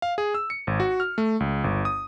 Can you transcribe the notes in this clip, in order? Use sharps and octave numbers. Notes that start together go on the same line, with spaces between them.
F5
G#4
E6
C#7
G#1
F#4
F6
A3
C#2
G1
D#6